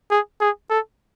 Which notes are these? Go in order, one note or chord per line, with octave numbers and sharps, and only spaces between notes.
G#4
G#4
A4